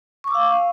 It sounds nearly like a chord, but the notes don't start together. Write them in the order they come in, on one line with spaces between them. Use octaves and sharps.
C#6 D6 E6 F5